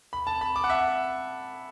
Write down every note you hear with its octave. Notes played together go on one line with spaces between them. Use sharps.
B5
A5
B5
D6
F#5
E5